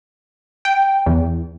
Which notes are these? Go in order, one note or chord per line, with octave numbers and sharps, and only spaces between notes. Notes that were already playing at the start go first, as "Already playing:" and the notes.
G5
E2